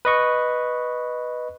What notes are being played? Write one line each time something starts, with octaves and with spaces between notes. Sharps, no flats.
B4 D#5 C#6